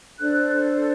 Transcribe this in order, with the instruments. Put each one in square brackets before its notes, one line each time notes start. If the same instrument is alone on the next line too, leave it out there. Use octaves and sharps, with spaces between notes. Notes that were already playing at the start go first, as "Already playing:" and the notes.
[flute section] D4 A4 C5 F#6